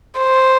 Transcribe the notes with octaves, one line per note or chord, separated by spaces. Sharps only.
C5